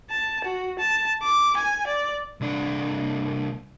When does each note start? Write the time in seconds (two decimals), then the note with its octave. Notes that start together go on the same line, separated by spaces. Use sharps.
0.10 A5
0.44 F#4
0.79 A5
1.23 D6
1.57 G#5
1.87 D5
2.41 C2 D4